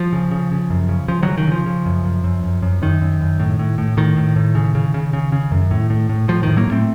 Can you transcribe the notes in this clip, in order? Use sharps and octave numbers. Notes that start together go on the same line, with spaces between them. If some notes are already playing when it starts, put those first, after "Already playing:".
Already playing: F3
C#3
C#3
C#3
F#2
C#3
C#3 F3
D#3 F#3
C#3
D#3
C#3 F3
C#3
F#2
F#2
F#2
F#2
F#2
F#2 D#3
F#2
F#2
A2
A2
A2
A2 D#3
A2
A2
C#3
C#3
C#3
C#3
C#3
F#2
A2
A2
A2
A2 F3
A2 D#3
F#3 A#3
A2 A3 C4